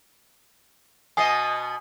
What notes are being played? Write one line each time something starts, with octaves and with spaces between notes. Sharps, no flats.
B2 B3 D#5 G#5 D#6 C7